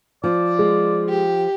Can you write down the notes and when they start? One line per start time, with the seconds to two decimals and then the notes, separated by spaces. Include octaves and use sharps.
0.24 F3 F4 D5
0.59 G#3
1.09 G4